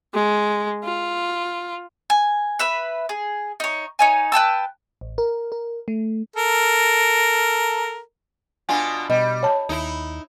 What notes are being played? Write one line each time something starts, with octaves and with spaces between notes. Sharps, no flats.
G#3
F4
G#5
B4 E5 B5
G#4
D#4 C#5
D#4 C#5 G#5
B4 G5 A5 E6
A1
A#4
A#4
A3
A4 A#4
B2 D4 F4 G#5
B2 G3 D#5
C#5 A5
D#2 D#4 E4